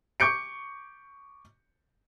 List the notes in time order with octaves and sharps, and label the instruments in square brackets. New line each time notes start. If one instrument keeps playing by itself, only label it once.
[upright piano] C#6 D6 G6 C#7 D7